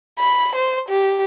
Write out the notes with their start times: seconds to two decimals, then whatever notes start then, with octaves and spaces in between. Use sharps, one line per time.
0.19 B5
0.55 C5
0.89 G4